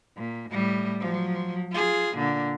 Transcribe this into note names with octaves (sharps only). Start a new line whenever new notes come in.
A#2
A2 G3
F3 F#3
F4 G#4
A#2 D3